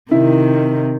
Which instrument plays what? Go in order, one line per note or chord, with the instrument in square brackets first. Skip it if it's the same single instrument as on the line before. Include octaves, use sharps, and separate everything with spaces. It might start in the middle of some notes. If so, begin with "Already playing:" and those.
[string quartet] C3 D#3 [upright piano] E4